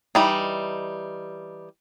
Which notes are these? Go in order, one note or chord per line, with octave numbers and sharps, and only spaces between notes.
E3 G3 D#4